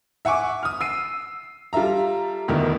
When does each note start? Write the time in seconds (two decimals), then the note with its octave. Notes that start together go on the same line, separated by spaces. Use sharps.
0.25 E5 F#5 G#5 C#6 D6
0.63 D#6 F6
0.81 E6 C7 D#7
1.73 G3 F4 A4 E5 A#5
2.48 E1 D2 D#3 B3 E4 A#4